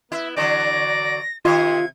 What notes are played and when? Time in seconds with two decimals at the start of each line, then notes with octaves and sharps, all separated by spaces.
0.12 B3 E4 E5
0.36 D3 E3 F#3 D5 A#6
1.45 C3 D#3 F4 D#5 G#6